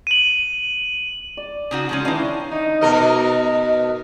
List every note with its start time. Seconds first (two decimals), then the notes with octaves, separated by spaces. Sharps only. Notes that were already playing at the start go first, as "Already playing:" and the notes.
0.07 D#7 F#7
1.37 D5
1.71 C#3 D#4 F#4
1.89 F3 G#3 C#4
2.05 D#3 E3 C#4 D4 F5
2.51 D#4
2.81 B2 A#4 D#5